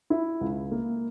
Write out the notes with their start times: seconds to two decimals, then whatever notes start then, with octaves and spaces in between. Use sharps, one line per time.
0.10 E4
0.41 C#2
0.71 A#3